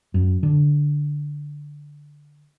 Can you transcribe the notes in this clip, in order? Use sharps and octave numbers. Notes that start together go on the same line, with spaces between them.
F#2
D3